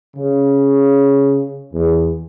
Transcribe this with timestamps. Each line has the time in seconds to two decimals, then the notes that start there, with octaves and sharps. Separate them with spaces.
0.16 C#3
1.74 E2